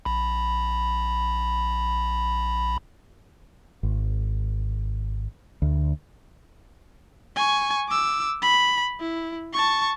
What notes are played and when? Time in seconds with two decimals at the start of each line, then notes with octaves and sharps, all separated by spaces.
0.05 A#1 B5
3.83 G#1
5.62 D2
7.36 G#5 C#6
7.89 D6 E6
8.42 B5
9.00 E4
9.53 A5 C#6